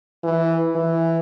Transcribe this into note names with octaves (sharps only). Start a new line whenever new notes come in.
E3
E3